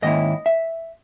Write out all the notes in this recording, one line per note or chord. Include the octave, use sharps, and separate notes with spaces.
G#2 D#3 A#3 C#4 E4 D#5
E5